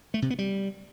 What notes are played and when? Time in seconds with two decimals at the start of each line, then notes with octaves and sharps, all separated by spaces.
0.14 A3
0.22 C3
0.30 B3
0.39 G3